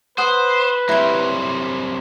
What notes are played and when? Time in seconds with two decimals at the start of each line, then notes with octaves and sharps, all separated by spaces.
0.18 B4 C5 F#5 D#6
0.89 F#3 G3 C4 E4 C5